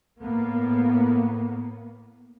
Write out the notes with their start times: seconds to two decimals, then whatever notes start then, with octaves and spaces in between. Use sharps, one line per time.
0.21 A2 A#3 B3